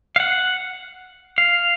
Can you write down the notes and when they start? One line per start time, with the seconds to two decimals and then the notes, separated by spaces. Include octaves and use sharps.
0.16 F5
0.20 F#5
1.38 F5